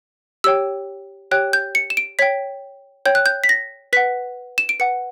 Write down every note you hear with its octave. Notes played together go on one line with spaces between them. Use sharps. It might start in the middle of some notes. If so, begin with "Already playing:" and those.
G4 C#5 G5 E6
G4 C#5 G5 F#6
G6
C#7
E7
D7
C#5 G5 B6
C#5 G5 G6
F#6
G6
B6
A#6
B4 F#5 B6
E7
D7
B4 F#5 C#7